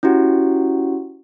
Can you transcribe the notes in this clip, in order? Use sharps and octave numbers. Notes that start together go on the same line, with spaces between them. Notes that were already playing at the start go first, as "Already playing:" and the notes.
C#4 E4 F#4 G4 F#5